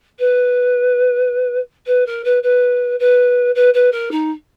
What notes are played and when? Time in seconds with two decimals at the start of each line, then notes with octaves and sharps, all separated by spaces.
0.18 B4
1.86 B4
2.06 A#4
2.24 B4
2.42 B4
2.99 B4
3.55 B4
3.73 B4
3.91 A#4
4.11 D#4